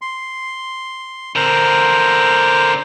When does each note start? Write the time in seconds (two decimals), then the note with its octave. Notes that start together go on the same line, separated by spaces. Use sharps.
0.02 C6
1.36 D3 C4 A#4 C5